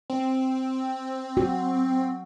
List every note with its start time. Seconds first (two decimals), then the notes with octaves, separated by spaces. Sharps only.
0.10 C4
1.37 F#4